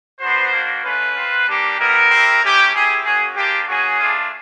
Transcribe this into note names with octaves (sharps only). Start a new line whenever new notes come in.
B3 D4 F#4 C5
A#3 D4 F#4
A3 C#4 F4 B4
C4 F4
G3 A#3 D4 G4
G3 B3 E4 A#4
C4 E4 G4
A3 C#4 E4 G4
C4 E4 G4 G#4
A#3 C#4 F#4 G#4
A#3 D4 F4 G4
A#3 C#4 F#4 G#4
A3 D4 F4